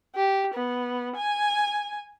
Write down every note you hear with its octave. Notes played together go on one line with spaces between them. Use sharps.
G4
B3
G#5